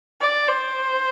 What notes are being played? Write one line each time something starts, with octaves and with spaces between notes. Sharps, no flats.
D5
C5